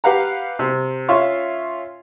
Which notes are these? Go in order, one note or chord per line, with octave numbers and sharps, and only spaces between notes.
G4 B4 F5 F#5 A#5
C3
C#4 F4 E5 F5 C6 C#6